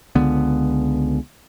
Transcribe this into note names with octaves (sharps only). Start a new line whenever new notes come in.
C#2 D3 B3